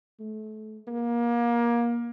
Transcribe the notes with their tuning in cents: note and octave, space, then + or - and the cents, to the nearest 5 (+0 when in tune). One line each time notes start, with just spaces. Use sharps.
A3 -30
A#3 +25